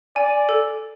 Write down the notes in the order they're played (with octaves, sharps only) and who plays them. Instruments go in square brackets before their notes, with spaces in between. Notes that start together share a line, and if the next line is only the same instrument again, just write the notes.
[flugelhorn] D5 [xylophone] G#5
[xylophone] A4